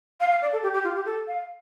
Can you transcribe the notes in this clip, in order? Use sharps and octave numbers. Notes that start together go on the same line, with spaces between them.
F5
F5
D5
A4
G4
G4
F4
G4
A4
F5